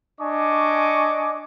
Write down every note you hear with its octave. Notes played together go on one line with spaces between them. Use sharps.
D4 D#5 G#5 C#6 D6